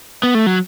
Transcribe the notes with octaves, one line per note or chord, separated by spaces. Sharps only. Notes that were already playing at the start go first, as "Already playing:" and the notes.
B3
A3
F#3